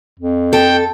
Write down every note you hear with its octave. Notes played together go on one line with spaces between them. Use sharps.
F2
A4 G5